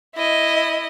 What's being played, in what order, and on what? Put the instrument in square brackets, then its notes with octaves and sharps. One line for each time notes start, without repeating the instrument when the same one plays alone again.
[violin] E4 D#5